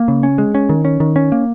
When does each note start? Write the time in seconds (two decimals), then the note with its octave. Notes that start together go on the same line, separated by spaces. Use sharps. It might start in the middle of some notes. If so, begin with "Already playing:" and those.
Already playing: A#3
0.08 C#3
0.23 C#4
0.38 G#3
0.55 C#4
0.69 D#3
0.85 C#4
1.00 D#3
1.16 C#4
1.32 A#3